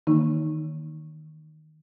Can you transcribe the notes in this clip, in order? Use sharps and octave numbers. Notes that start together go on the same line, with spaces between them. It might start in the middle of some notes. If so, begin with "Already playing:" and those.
D#3 E3 A#3 D#4